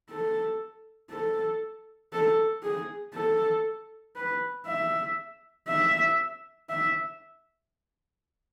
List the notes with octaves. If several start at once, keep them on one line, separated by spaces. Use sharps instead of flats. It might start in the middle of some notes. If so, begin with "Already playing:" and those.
A4
A4
A4
G#4
A4
B4
E5
E5
E5